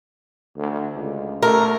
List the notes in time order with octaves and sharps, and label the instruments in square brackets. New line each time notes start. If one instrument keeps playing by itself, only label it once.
[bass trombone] D2
C#2
[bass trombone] A3 [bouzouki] A#4